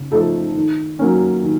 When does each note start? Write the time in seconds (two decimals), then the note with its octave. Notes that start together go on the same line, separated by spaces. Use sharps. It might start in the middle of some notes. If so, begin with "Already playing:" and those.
Already playing: C#3
0.12 F3 A3 D#4 A4
0.55 D#3
0.99 F#3 A#3 C#4
1.43 D#3